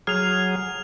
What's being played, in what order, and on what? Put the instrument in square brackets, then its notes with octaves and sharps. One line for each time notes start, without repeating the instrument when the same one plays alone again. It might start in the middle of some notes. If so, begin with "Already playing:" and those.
[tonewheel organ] F#3 G#4 [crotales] F6 F7